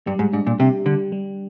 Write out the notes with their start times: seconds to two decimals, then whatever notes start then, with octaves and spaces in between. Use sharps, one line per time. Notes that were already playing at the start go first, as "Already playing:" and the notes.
0.06 G2 G3
0.19 G#2
0.33 G#2 D4
0.47 A#2
0.59 C3 G4
0.86 D3 G3
1.12 G3